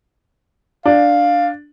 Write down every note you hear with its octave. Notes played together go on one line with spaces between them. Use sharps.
D4 F5